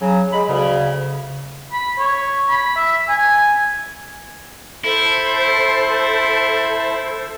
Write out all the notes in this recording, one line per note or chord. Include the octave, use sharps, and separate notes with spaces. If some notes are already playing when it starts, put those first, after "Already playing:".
C#3 F#3
G#3 B5
D2 C#3
B5
C#5
B5
E5
G#5
E4 A4 C5 A5